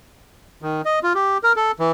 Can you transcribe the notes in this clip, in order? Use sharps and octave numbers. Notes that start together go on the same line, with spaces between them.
D#3
D#5
F4
G4
A#4
A4
E3